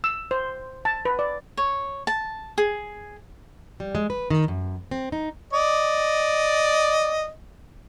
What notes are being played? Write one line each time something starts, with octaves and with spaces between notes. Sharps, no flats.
E6
C5
A5
B4
D5
C#5
A5
G#4
G3
G#3
B4
D#3
F#2
C4
D#4
D5 D#5